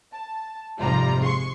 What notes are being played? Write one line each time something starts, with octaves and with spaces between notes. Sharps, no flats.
A5
G#1 F2 C3 G3 F4 A#5
G#3 C6 C#6